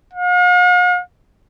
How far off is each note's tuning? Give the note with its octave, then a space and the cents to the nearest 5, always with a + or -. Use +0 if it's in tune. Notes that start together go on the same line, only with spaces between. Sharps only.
F5 +45